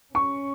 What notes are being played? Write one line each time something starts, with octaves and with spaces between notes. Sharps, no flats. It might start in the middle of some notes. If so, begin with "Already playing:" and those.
C#4 C#6